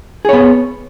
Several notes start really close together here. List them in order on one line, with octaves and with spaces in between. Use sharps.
G#4 C#5 B3